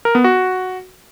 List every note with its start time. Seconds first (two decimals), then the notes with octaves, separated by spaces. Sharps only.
0.05 A#4
0.15 B3
0.24 F#4